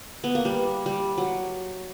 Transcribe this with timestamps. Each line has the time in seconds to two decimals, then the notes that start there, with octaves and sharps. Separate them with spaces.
0.24 B3
0.35 A#3
0.45 G3
0.86 G3
1.18 F#3